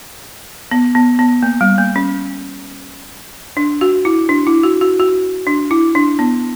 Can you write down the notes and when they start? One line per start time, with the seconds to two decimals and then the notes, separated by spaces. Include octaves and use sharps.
0.71 B3
0.95 B3
1.19 B3
1.43 A#3
1.61 G3
1.78 A#3
1.96 C#4
3.57 D4
3.81 F#4
4.05 E4
4.29 D4
4.47 E4
4.63 F#4
4.81 F#4
5.00 F#4
5.47 D4
5.71 E4
5.95 D4
6.19 B3